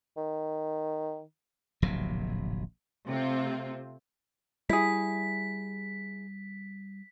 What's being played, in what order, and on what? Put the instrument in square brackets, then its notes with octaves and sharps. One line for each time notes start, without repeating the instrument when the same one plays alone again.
[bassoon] D#3
[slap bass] D1 A#1 C3 F#3
[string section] C3 A3 C4 F4
[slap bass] G3 [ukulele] E4 G#4 [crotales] B6